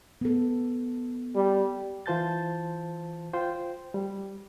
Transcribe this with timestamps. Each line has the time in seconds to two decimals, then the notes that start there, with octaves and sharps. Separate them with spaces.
0.21 B3 A4
1.35 G3
2.06 E3 F4 C5 A5 G6 A6
3.34 F4 C5 G5
3.94 G3